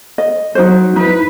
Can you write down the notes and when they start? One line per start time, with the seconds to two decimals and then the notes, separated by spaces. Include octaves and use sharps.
0.18 D#5
0.55 F#3 D#4 F#4 C5
0.96 D#4 E4 B4